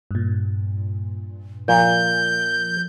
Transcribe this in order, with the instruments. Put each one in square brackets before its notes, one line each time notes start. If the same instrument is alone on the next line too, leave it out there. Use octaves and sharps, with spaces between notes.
[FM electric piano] G2 A#2
[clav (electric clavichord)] A#2 [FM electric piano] F3 [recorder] G6